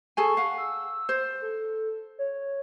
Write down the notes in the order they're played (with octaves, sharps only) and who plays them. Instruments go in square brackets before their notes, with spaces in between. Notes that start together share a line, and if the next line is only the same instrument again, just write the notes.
[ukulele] G#4 A4 G#5 [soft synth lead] C#6
[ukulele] F5 F#5
[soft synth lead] E6
[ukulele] C5
[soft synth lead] A4
C#5